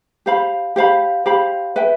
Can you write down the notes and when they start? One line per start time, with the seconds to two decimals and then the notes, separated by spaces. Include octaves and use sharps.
0.26 G4 C5 F5 B5
0.76 G4 C5 F5 B5
1.26 G4 C5 F5 B5
1.76 B4 E5 G5